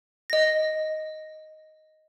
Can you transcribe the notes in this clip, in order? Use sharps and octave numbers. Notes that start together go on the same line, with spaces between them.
D#5 A#6